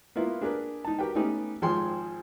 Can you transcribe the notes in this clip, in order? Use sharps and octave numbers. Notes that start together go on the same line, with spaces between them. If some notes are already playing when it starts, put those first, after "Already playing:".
A#3 B3 E4 F4
D4 G4 G#4 A#4 B4
D#4 A5
F#4 G4 A#4 B4 G5
A3 B3 C#4 D#4 G4
G#1 F3 G#4 G5 G#5 C6